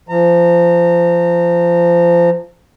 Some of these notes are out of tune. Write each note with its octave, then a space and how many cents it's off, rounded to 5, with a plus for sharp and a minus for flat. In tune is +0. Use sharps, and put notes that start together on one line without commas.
F3 -25 A#5 -30